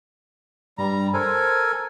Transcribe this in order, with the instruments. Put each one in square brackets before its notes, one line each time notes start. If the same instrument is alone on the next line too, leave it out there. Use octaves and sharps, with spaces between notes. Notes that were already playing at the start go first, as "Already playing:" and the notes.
[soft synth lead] G2 [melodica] G3 A#5
[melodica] A4 A#4 G#5 [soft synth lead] C5